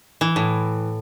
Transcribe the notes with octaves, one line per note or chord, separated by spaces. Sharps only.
E3
A2